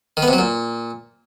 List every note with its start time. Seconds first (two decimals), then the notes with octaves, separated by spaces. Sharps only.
0.17 D#3
0.22 B3
0.28 C3
0.33 F#3
0.38 A#2